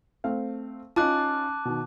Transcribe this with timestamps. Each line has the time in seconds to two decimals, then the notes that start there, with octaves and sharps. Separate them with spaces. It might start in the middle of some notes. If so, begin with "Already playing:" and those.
0.24 A3 C4 F5
0.96 C#4 D#4 F4 A5 D6 F#6
1.65 B2 D#3